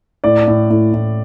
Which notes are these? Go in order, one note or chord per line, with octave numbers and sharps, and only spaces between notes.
A2 D5
A2
A2
A2